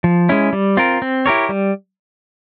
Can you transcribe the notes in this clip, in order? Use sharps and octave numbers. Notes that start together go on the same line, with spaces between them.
F3
G#3 C#4 E4
G3
C4 F4 A#4
C4
E4 G4 A#4 C#5
G3